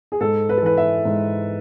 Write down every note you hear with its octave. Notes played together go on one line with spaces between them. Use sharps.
G#4
G#2 A4
B4
A4
E3 B4
E5
G#2